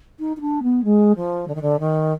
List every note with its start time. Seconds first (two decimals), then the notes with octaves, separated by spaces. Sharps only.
0.19 D#4
0.37 D#4
0.41 D4
0.63 B3
0.84 G#3
1.16 F3
1.48 D3
1.55 D#3
1.62 D3
1.79 D#3